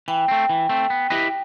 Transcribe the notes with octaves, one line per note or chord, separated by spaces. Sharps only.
E3 G5
A3 C4
E3
A3 C4
B3
E4 G4 B4 D#5